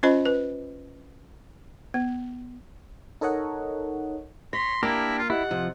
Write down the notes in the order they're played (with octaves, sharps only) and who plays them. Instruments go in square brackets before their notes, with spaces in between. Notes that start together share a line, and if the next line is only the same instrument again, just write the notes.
[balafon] C#4 F4 C5 D#5 B5
B4
B3
[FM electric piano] D#4 A4 A#4 C#5 D#5 F#5
[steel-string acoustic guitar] C#5 [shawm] C6 [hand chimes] A#6 B6
[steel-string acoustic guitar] A#3 [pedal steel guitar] D4 G4 A#4 [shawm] E4
[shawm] F4
[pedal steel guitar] E4 [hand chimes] G4 D#5 [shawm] F#5
[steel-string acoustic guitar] C3 [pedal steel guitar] F3